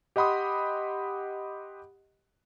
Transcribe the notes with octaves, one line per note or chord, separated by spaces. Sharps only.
G4 D#5 F#5 B5 C6 D#6